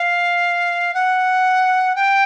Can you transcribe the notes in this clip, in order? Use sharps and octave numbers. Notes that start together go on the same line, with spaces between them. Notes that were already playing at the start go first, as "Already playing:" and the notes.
Already playing: F5
F#5
G5